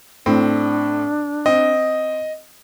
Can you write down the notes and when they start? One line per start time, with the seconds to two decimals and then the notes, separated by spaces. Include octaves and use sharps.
0.26 A2 C4 D4
1.46 C4 D#5